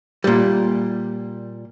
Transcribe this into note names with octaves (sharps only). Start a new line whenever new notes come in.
A#2 G3